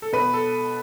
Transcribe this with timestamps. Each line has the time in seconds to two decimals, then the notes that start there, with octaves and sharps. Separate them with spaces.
0.02 A4
0.13 B2 B4
0.33 A4